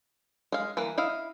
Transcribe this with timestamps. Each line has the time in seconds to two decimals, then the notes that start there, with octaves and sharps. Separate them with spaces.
0.52 G#3 F5
0.77 E3 A#3 B4
0.98 E4 D#5 F5